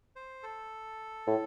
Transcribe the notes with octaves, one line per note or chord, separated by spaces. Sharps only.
C5
A4
A2